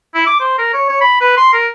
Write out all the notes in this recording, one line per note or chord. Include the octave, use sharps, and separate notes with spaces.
E4
D6
C5
A#4
C#5
C#5
B5
B4
C6
A#4